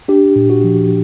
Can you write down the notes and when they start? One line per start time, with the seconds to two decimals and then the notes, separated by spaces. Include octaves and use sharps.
0.08 D4 G4
0.36 A#2
0.50 F#4
0.64 F3